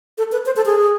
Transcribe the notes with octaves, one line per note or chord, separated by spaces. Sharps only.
A4
B4
C5
A4
G#4